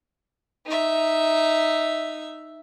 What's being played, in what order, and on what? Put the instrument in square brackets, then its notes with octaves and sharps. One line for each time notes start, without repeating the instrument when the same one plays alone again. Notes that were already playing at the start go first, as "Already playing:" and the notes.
[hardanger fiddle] D#4 E5